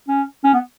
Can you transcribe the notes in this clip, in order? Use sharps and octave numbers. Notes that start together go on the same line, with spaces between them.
C#4
C#4
B3